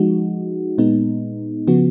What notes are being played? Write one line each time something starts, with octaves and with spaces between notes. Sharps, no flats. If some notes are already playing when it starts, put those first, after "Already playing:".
Already playing: F3 G#3 D#4 F#4
A#2 G#3 B3 D#4
C#3 F3 B3 F#4